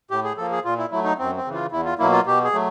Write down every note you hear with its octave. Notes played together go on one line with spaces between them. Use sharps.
A2 G4
G#4
F3 A#3 A4
G#4
A#2 F4
E4
F#3 A3 E4
D#4
F#2 C4
C4
C#3 E3
F4
E2 E4
F4
B2 F#3 A#3 E4
F4
B2 G4
G#4
F#3 A3